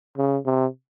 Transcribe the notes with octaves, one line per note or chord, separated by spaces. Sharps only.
C#3
C3